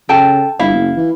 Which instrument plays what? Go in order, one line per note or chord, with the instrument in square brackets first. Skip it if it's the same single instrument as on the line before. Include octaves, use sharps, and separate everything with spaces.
[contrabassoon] C#3 [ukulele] A4 G5 A5
[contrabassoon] G1 [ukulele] E4 F5
[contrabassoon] F#1
E3